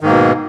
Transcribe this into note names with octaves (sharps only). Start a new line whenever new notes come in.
G#2 B2 D#3 A#3